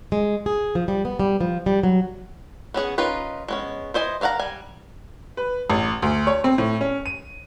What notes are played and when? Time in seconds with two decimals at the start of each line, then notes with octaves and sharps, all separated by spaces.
0.12 G#3
0.46 G#4
0.75 F3
0.88 G3
1.05 B3
1.20 G3
1.41 F3
1.66 G3
1.83 F#3
2.74 B3 C#4 G#4 F#5
2.98 C#4 D#4 F4 A#4 B4
3.48 G#3 B3 C#4
3.94 E3 C5 D#5 G#5
4.21 D4 A#4 F5 F#5 A#5
4.39 G3 G#5
5.37 B4
5.70 A1
6.02 D2
6.27 C#5
6.44 C4
6.58 A2
6.81 C#4
7.06 D#7